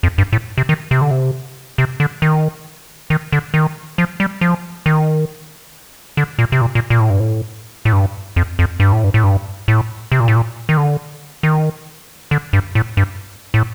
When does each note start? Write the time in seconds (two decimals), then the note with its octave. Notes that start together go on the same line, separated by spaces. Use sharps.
0.03 F2
0.18 G2
0.33 A2
0.58 C3
0.69 D#3
0.91 C3
1.01 D3
1.11 C3
1.78 C3
2.00 D3
2.22 D#3
3.10 D#3
3.32 D3
3.54 D#3
3.98 F3
4.20 G3
4.41 F3
4.86 D#3
6.17 D3
6.39 A#2
6.52 C3
6.61 A#2
6.75 A#2
6.90 A#2
7.00 A2
7.10 G2
7.20 A2
7.85 A2
7.93 G2
8.36 F2
8.59 F2
8.80 G2
8.92 A2
9.04 G2
9.14 A2
9.24 G2
9.68 A2
10.12 C3
10.20 A#2
10.28 A2
10.36 A#2
10.69 D#3
10.77 D3
11.43 D#3
12.31 D3
12.53 G2
12.75 A2
12.97 G2
13.54 A2